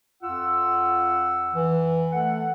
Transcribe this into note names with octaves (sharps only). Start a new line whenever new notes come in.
F2 F4 F#5 E6
E3
A3 A4 F#5